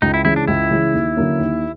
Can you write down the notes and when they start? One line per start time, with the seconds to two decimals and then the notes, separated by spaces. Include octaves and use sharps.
0.02 C#2 D#4
0.14 E4
0.25 C#3 E3 G#3 E4
0.36 D4
0.47 C#2 E4
0.71 C#3 E3 G#3
0.94 D#2
1.16 D3 F#3 A#3 C#4
1.39 D#2